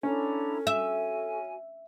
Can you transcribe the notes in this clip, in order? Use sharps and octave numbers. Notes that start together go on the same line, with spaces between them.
C#4 D4 E4 A4 A#5
F#4 E5 G#5